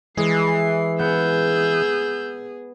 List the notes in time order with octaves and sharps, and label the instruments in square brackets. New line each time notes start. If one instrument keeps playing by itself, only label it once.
[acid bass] E3 [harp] G#3 [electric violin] C7
[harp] B3 [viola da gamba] G#4 [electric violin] E6 G6